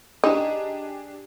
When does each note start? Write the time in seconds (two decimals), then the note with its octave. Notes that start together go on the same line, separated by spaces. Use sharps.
0.24 D4 D#4 G4 G#4